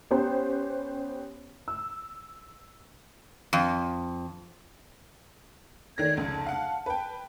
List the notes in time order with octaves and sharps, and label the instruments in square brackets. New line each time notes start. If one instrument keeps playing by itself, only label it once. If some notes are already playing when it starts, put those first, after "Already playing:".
[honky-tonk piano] B3 C#4 G4 C5
E6
[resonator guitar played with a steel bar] F2
[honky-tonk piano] D#3 A3 A#6 [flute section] C#5 D5 G#6
[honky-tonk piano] F1 C#2 [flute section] A5
[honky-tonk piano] F5 F#5
B4 G5